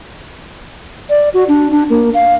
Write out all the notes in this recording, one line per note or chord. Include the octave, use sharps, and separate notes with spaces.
D5
F#4
D4
D4
A#3
F5